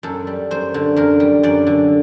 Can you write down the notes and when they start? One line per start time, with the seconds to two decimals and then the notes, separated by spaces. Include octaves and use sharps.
0.03 F#2 A4
0.27 G3
0.51 F#2 C5
0.74 D3
0.96 F#2 A#4
1.20 G3
1.43 F#2 D5
1.67 D3